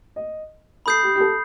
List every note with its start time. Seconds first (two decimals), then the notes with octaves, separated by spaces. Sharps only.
0.16 D#5
0.86 A4 B5 D#6 G6 C7
1.03 G4
1.15 G4
1.20 A4